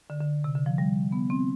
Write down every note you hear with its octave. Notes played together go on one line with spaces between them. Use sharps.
D3
D3
C3
D3
F3
G3
B3
C4